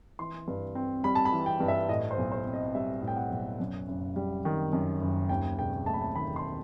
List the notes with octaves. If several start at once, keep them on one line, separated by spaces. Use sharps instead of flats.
E3 C6
G2
C4
G3 B5
A5
B5
E3
G5
G2
E5
A2 D#5
C5
B1
C5
C4
D#5
G3 E5
A2
G5
F#5
B1
F#2
F#1
G3
D#3
F#2
F#1
D#2 G5
E1 G5
A3 A5
B5
A5
D#3 B5
C6